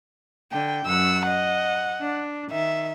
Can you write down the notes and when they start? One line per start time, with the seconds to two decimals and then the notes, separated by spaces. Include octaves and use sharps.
0.52 D3 G5
0.86 F#2 F#5 E6
1.28 D#5 F#5
2.01 D4
2.51 D#3 E5